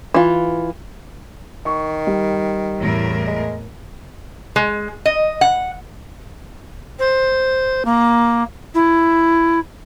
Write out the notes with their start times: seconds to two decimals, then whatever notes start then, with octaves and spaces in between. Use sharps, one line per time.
0.14 E3 F4
1.65 D#3 C#6
2.07 G3
2.80 E2 A2 A#4
3.27 G#3
4.56 G#3
5.06 D#5
5.41 F#5
6.99 C5
7.85 A#3
8.74 E4